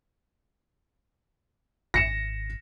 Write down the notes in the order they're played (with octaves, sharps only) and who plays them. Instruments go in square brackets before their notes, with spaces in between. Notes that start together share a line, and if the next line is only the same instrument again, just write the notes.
[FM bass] G#1 [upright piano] A#6 C#7 E7